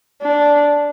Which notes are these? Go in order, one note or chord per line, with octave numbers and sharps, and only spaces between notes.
D4